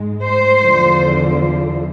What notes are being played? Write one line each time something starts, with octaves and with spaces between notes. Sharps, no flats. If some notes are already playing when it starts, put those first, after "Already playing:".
Already playing: G#2 G#3
C5
E2 D3 F3